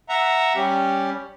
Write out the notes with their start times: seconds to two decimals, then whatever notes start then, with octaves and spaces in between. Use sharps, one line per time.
0.09 E5 F#5 A#5
0.56 G3 C#4 G4